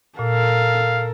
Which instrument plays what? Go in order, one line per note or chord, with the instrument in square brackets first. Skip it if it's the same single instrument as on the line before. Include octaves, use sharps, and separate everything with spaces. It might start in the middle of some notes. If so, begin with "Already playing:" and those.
[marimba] A#2 [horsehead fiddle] A4 A#4 [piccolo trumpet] F5